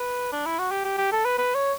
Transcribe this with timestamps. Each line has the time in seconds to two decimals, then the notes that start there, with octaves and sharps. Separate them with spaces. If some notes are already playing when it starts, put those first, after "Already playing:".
Already playing: B4
0.32 D4
0.46 E4
0.59 F#4
0.71 G4
0.85 G4
0.98 G4
1.12 A4
1.25 B4
1.38 B4
1.55 C#5